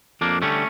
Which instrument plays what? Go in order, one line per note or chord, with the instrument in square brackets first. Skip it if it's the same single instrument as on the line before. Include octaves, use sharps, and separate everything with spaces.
[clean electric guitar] F2 A#3 D4
D3 G3 A3 C#4